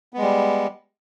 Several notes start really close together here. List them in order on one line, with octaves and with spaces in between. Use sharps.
B3 G#3 G3